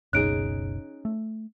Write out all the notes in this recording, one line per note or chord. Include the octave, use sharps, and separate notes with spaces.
F#1 C#2 B2 C#4 D#4 G#4 F#6 D7
A3